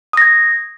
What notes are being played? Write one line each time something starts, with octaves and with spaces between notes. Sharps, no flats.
D#6 G#6 A#6